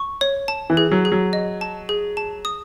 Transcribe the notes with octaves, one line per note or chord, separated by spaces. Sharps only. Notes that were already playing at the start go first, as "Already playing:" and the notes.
Already playing: C#6
C#5
A5
E3
G#4
F#3
G#4
F#3
D#5
A5
G#4
A5
D#6